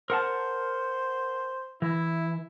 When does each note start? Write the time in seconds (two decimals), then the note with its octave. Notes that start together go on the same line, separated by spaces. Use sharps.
0.10 A#4 C5 F#5 A5
1.82 E3 E4